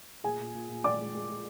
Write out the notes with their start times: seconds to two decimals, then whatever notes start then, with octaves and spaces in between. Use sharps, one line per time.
0.24 A#2 G#4 G#5
0.40 A#2
0.55 A#2
0.69 A#2
0.84 A#2 D5 D6
0.99 G#3
1.15 G#3
1.29 G#3